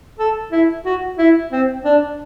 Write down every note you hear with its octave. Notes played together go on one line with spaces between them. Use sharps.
A4
E4
F#4
E4
C4
D4